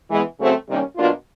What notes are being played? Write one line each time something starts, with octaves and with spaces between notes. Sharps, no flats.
E3 G#3 B3
C#3 F#3 A3 C4
C3 D#3 G3 A#3 C#4
B2 F#3 A#3 D4 F4